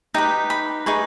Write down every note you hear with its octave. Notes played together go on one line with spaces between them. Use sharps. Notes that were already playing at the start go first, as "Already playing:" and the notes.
D#4 G4 B4 G5
B5
D#4 G#4 B4 C#6